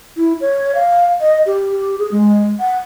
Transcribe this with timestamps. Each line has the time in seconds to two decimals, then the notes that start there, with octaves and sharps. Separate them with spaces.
0.17 E4
0.41 C#5
0.75 F5
1.20 D#5
1.46 G4
1.99 G#4
2.12 G#3
2.60 F#5